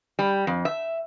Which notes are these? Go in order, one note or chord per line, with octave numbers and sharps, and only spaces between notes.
G3
F2
E5